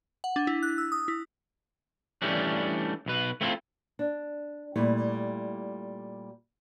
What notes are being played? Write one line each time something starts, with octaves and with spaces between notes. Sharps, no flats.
F#5
D4
E4
F#6
E6
D#6
E4
E3 G3 A3 C#4 D4
B1 B2 B4
A3 B3 C4 E4 F4 A4
D4
A#2 G3 A3 E4